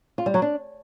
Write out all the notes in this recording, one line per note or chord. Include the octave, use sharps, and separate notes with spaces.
F4
G3
F#3
D4